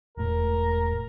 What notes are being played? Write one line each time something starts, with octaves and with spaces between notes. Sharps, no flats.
E1 A2 A#4